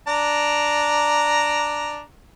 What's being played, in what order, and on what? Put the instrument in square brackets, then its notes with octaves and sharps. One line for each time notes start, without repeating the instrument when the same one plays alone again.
[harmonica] D4 A#5